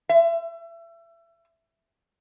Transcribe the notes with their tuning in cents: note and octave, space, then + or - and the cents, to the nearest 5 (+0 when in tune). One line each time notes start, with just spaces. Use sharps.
E5 +30